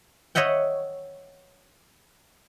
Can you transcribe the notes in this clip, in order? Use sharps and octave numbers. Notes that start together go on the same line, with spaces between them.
C#5 D#5 E5 F#5 G5